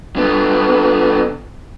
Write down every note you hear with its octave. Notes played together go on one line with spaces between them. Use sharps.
D3 B3